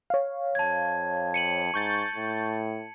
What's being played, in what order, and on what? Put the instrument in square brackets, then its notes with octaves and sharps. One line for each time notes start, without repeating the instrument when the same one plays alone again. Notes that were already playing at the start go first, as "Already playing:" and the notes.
[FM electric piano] C#5 F5
[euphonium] F2 [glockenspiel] A5 G#6
[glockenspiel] C#7 D#7 F#7
[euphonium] G#2 [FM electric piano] C#6 G6 A6
[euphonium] A2